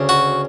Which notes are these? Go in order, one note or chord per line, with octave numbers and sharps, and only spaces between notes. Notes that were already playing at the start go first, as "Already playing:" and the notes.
Already playing: D2 C#3
F#4